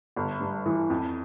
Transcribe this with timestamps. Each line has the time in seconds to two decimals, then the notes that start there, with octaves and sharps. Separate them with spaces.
0.16 G1
0.40 G2
0.66 E3
0.90 F2